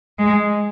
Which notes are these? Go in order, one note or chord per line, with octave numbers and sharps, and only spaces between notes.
G#3